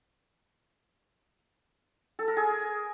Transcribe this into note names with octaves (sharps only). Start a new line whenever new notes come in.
A4
A#4
G#4